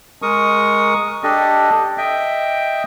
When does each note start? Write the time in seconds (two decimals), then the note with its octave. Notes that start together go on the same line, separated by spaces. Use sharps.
0.22 G#3 A#4 C#6 D#6
1.23 D4 G4 A4 D#5
1.98 D#5 E5 G5